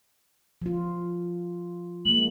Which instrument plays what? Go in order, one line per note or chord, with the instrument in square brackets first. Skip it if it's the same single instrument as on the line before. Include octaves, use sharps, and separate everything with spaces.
[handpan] F3 F4
[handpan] G#3 A#3 [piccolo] F#7